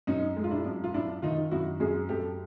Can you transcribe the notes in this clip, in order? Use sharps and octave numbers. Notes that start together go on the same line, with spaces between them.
F#2 C#4 D#4
G#3
F4
D4 E4
F#2
F4
F#2 D4 E4
D#3 D#4 F4
F#2 E4 F#4
F#2 F#4 G#4
F#2 G4 A4